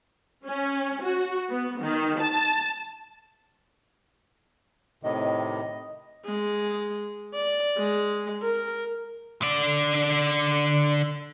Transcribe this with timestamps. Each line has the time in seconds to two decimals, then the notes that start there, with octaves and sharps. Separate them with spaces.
0.45 C#4
1.03 F#4
1.50 B3
1.82 D#3
2.20 A5
5.03 A2 C3 D#3 D#5
6.26 G#3
7.34 D5
7.78 G#3
8.42 A#4
9.42 D3 D5